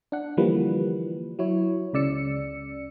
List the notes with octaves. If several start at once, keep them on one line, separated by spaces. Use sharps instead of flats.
D4 F#5
D3 E3 F3 G3 A#3 B4
F#3 E4 C#5
C#2 C#3 D5 E6 C#7